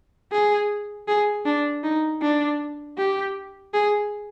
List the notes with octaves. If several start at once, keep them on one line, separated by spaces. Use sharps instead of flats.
G#4
G#4
D4
D#4
D4
G4
G#4